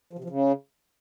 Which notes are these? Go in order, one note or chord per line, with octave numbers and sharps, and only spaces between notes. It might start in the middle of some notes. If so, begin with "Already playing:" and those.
F3
C3
F3
C#3